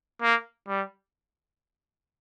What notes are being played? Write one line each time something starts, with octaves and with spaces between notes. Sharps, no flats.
A#3
G3